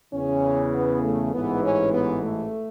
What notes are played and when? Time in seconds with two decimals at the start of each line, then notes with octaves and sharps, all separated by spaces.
0.13 E2 C#3 E3 C#4
0.73 B3
1.03 A3
1.33 A1 G#2 E3 B3
1.63 C#4
1.93 B3
2.22 A3